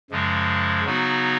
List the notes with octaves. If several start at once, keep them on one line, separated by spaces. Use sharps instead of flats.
F#2 C#3 F3 G#3
C#3 F#3 B3 D#4 F#4